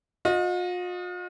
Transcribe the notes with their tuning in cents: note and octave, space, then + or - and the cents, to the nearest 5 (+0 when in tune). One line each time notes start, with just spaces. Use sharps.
F4 +45 D#5 +0